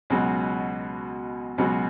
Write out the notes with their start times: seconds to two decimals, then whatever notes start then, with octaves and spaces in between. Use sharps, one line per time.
0.10 C#2 B2 F#3
1.58 C#2 B2 F#3